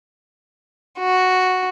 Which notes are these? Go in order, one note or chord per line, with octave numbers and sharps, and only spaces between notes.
F#4